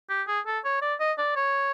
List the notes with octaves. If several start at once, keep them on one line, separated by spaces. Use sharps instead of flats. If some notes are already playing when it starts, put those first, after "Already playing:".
G4
G#4
A4
C#5
D5
D#5
D5
C#5